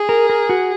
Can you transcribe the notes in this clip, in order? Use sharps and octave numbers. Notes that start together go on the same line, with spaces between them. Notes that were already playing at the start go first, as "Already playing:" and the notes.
Already playing: G#4
A#4
A#4
F#4